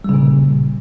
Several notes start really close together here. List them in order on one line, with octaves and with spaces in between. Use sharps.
G3 C#3 A#2